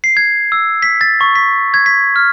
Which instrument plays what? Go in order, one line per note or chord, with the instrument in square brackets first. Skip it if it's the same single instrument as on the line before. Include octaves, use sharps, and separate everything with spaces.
[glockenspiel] C7
G#6
E6
B6
A6
C#6
B6
G#6
B6
F6